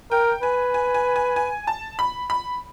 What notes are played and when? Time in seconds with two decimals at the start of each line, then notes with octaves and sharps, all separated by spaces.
0.11 A#4 G5
0.43 B4 G#5
0.74 G#5
0.94 G#5
1.16 G#5
1.36 G#5
1.67 A5
1.99 B5
2.30 B5